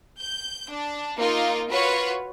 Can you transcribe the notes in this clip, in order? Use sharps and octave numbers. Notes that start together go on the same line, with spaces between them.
G6
D4
A#3 D#4 F4 A#4
F4 F#4 B4 C#5